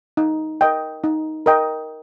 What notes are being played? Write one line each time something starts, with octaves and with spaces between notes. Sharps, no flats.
D#4
A#4 D#5 G5
D#4
A#4 D#5 G5